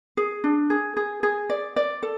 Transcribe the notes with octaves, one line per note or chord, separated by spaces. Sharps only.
G#4
D4
G#4
G#4
G#4
D5
D5
A4